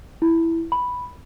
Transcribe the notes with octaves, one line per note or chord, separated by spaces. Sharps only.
E4
B5